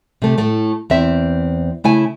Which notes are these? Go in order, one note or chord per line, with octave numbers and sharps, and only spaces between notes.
C3 A3
A2 A3
E2 C4 E5
C#3 A3 E4 G#5